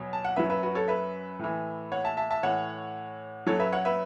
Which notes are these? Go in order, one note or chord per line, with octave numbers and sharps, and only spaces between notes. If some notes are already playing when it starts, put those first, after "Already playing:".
Already playing: E2 B2 F#3 C#5
A5
F#5
F#2 F#3 B4 E5
B4 E5
F#4 B4
A4 C#5
B4 E5
A2 E3
C#5 F#5
E5 A5
E5 A5
E5 A5
A2 E3 C#5 F#5
F#2 F#3 A4 C#5
B4 E5
C#5 F#5
B4 E5